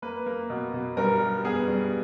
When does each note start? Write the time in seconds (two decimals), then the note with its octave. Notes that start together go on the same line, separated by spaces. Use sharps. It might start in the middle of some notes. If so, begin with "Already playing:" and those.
0.02 A#3 B4
0.26 A#3
0.50 B2
0.73 B2
0.97 G2 A#4
1.21 G3
1.45 B3 G#4
1.68 G2